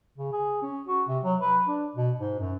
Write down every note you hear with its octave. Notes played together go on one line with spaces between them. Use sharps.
C#3
G#4
C#4
F#4
C3
F#3
B4
D4
B2
G#2
F#2